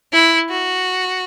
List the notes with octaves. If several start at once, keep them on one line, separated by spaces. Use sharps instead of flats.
E4
F#4